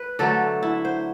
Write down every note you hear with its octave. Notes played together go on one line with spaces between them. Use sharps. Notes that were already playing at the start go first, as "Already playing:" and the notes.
Already playing: B4
D3 F#3 A3 A4
E4
C5